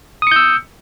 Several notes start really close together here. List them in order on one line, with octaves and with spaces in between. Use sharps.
D#6 C#7 G6 E6